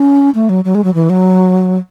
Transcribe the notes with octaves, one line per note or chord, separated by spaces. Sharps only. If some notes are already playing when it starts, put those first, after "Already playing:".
Already playing: C#4
A3
F#3
F#3
G#3
F#3
E3
F#3